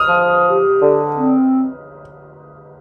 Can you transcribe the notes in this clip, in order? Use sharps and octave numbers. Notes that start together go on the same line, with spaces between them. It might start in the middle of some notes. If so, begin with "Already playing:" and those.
Already playing: D#6 F6
F3
G4
D3
C4